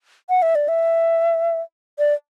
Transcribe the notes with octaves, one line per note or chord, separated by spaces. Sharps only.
F#5
E5
D5
E5
D5